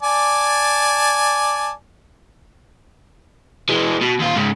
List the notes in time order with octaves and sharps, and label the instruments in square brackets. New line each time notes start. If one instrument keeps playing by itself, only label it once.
[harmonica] D5 G#5 A5
[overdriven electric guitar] E3 G#3
B2
D#2 F4
G#2 C#3